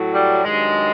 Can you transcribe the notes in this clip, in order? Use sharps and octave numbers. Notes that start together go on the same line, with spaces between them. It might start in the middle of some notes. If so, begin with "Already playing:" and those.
Already playing: A2 F#3
G3
G2 D#3 F#3 G#3